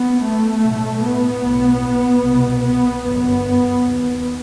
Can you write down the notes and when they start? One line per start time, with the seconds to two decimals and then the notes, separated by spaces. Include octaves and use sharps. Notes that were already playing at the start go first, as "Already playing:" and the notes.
Already playing: B3
0.23 A3
0.63 B1 A2
1.04 B3
1.44 B1 A2
2.24 C2 B2
2.64 B3
3.04 G1 F#2 B3
3.84 D#2